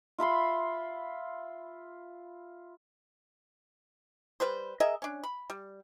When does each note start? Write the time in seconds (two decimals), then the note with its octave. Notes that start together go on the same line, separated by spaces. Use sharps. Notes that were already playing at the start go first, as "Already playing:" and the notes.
0.19 F4 E5 B5 C6
4.40 G3 B4 C5
4.80 G#4 A#4 D#5 E5
5.02 C#4 D4
5.23 B5
5.50 G3